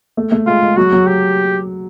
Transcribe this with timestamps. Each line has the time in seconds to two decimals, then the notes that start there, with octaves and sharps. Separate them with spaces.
0.17 A3
0.32 A3
0.47 G#3 F4
0.62 G#3
0.77 F#3 F#4
0.92 F#3
1.07 G4